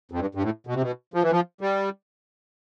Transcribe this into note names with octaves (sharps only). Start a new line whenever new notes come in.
F2
G2
G2
A2
B2
C3
B2
F3
E3
F3
G3